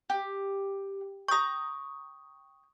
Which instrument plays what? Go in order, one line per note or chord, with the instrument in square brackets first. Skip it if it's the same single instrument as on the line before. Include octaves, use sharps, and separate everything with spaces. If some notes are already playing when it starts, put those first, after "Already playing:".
[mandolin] G4
[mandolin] G5 A#5 [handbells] C#6 D#6